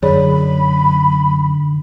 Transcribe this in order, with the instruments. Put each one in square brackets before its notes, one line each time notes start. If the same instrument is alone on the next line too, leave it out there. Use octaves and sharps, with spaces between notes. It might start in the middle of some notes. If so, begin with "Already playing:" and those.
[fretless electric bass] F#2 [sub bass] D3 [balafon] G#4 C#5 D5 [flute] B5